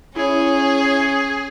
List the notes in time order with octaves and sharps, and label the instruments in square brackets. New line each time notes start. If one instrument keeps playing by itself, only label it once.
[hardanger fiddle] C#4 [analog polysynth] E4 C#5 [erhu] G#4